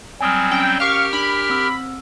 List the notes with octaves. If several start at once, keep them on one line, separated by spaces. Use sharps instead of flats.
F#3 G3 C4 G#5 D#6 F6
C#4 G5 D7
G4 A#4 F5 C#6 F6
D4 B5
C4 E6